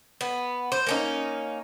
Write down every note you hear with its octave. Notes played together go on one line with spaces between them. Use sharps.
B3
C5
A#3 C#4 D#4